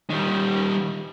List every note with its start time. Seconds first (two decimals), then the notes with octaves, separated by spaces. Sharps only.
0.10 D#3 G3